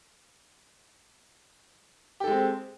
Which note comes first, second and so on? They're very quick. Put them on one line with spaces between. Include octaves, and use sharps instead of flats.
G4 A4 G#3 C4